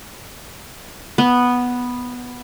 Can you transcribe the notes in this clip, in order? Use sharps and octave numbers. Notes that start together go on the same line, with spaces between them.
B3